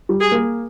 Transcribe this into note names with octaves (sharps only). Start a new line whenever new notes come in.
G3
G#4
A#3